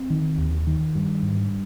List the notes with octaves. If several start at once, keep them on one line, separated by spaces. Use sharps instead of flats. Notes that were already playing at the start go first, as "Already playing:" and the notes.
Already playing: C4
D#3
D#2
D#3
G2
G#2